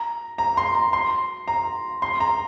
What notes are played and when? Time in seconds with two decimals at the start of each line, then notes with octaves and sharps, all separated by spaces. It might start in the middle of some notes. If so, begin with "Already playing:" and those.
Already playing: A#5
0.38 A#5
0.57 C6
0.75 A#5
0.93 C6
1.48 A#5
2.02 C6
2.20 A#5